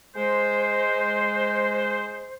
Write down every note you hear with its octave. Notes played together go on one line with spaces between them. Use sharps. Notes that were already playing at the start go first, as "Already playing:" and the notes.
G#3 C5